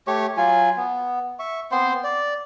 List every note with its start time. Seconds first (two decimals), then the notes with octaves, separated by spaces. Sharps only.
0.07 A3 G4 C#5 C#6
0.37 F#3 F4 G#5
0.77 B3
1.39 E5 C#6
1.72 B3 C4 C5 C6
2.04 D5